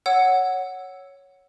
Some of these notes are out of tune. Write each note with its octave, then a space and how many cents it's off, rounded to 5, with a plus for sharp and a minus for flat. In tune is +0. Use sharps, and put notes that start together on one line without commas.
C#5 +0 F#5 +0 E6 +0